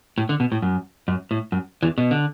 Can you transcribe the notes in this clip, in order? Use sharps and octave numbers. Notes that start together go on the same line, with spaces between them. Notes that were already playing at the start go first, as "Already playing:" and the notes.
A2
D3
B2
A2
F#2
F#2
A2
F#2
E2 E3
B2
D3